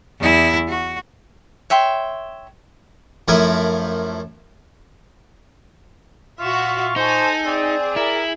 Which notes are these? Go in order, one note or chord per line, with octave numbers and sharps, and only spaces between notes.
E2 E4
F#4
C#5 E5 G5 C6
F#2 F3 A3 E4 A#4 G#5
A#2 F4 F#4 E5 C#6
D#4 A4 C5 G#5
C4 G#4 D5
E4 A#4